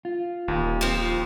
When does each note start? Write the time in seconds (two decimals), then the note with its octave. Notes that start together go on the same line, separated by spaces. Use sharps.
0.05 F4
0.48 D#1 D#2
0.81 F3 C4